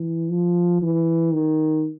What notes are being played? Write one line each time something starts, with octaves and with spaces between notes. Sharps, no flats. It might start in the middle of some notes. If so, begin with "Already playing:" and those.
Already playing: E3
F3
E3
D#3